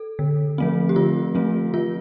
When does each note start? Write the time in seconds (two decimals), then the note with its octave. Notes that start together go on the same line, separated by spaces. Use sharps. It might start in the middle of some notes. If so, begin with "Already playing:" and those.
Already playing: A4
0.19 D3
0.58 F3 A3 C4
0.89 G4
0.96 D3 F4
1.35 F3 A3 C4
1.74 F3 F4